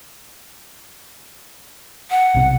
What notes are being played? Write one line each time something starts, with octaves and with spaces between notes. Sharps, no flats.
F#5
B1 C3